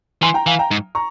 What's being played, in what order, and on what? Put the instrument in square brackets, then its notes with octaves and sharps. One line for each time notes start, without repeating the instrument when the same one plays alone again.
[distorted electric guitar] E3 [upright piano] G#5 C6
[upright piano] G5 A#5
[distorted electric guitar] E3 [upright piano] F5 G#5
[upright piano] G5 A#5
[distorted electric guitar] G#2
[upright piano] A#5 C#6